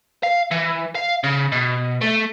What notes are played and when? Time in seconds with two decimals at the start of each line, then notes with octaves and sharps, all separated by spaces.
0.23 F5
0.51 E3
0.95 F5
1.24 C#3
1.52 B2
2.01 A3